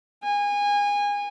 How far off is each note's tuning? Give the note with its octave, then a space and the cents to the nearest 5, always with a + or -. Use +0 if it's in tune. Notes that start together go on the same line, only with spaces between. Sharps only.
G#5 -25